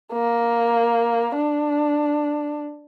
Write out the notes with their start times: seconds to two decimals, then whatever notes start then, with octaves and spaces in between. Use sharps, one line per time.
0.12 A#3
1.36 D4